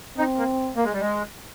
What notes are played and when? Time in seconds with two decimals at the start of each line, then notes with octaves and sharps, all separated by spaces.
0.17 C4 D#4
0.38 A#3
0.76 A#3
0.85 G#3
0.93 G3
1.00 G#3